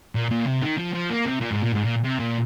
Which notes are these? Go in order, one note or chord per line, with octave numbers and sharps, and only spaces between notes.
A#2
A#2
C3
D#3
F3
F3
A#3
C3
A#2
G#2
A#2
G#2
A#2
C3
A#2